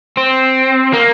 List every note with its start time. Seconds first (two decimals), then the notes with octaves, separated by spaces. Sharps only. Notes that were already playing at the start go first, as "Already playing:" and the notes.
0.17 C4
0.93 A#3